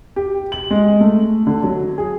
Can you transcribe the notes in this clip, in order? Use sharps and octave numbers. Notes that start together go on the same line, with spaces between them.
G4
F#7
G#3
A3
D3
F#3
G#4